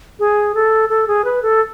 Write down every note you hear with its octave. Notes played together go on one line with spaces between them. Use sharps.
G#4
A4
A4
G#4
B4
A4